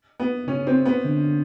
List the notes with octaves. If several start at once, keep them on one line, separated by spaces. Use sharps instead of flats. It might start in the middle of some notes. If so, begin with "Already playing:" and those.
B3
C#3 C#4
C4
B3
D3